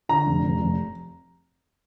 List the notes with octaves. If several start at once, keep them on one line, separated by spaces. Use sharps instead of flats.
D3 A#5
F1
F1
F1